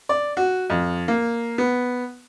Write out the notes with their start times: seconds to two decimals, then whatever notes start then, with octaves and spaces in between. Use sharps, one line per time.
0.09 D5
0.37 F#4
0.70 F2
1.08 A#3
1.58 B3